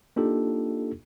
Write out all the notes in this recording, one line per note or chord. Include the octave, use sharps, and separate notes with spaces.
A#3 D4 D#4 F4 G4 A4